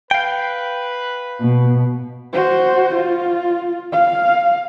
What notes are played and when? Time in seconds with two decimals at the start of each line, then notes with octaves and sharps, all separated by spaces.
0.11 B4 F5 G5
1.41 B2
2.33 F#4 C5
2.95 F4
3.93 F5